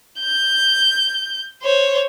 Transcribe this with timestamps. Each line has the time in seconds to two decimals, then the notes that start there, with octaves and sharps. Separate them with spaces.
0.20 G6
1.63 C5 C#5